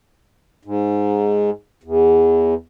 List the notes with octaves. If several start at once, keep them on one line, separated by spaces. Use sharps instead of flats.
G#2
E2